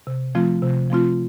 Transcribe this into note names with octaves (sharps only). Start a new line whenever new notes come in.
C3
F3 A3 C4 F4
C3
F3 A3 C4 F4